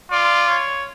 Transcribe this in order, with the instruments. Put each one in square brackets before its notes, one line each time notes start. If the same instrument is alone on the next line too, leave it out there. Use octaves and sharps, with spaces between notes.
[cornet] F4 [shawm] D5
[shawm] C#5